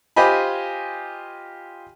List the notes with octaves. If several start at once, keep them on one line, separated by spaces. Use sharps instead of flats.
F4 G4 C5 D#5 G#5 B5